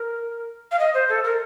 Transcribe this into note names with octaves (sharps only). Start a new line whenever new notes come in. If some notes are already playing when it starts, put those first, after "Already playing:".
Already playing: A#4
F5
D#5
C5
A4
A#4